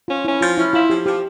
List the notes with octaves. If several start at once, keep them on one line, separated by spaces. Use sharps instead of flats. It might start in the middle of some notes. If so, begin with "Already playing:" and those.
C#4 F4
C#4 E4
F3 F4
C#4 E4
E4 F4
F3 G4
F3 G4